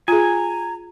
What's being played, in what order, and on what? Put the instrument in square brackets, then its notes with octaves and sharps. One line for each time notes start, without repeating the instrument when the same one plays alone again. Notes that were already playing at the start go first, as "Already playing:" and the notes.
[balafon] F4 G#4 [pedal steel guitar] G#5 [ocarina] A#5